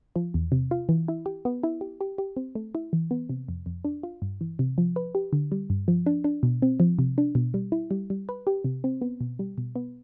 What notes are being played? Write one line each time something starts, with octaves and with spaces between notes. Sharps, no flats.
F3
E2
C3
F4
E3
E4
G4
B3
E4
G4
G4
G4
C4
A3
E4
E3
B3
C3
F2
F2
D4
F4
G2
E3
C3
F3
B4
G4
D3
G3
G2
F3
D4
D4
B2
C4
F3
C3
D4
B2
G3
E4
G3
G3
B4
G4
C3
C4
B3
B2
G3
B2
B3